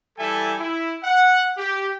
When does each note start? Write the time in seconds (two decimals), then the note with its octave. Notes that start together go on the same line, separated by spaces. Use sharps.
0.19 E3 G3 E4 A4 E5 G#5
0.59 E4
1.02 F#5
1.57 G4